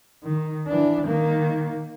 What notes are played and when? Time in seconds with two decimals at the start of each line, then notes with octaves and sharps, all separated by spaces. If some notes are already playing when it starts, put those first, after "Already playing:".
0.24 D#3
0.68 E3 D4
1.06 D#3 A#3